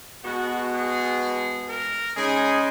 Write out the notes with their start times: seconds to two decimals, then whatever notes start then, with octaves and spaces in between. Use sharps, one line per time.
0.23 B2 G#3 B3 F#4
0.72 G#4
1.69 A#4
2.16 C#3 G#3 D#4 G#4